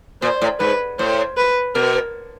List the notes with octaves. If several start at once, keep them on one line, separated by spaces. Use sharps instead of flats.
A#2 C5
A2
G#2 B4
A2 C5
B4
B2 A#4